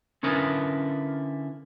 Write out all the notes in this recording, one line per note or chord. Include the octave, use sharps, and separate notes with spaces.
D3 C#4 E4 A#4 B4